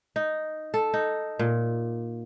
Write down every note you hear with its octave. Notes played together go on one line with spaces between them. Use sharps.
D#4
A4
D#4
A#2